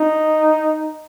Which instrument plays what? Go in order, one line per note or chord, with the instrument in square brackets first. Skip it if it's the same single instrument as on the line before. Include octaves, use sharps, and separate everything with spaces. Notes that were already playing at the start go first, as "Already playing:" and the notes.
Already playing: [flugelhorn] D#4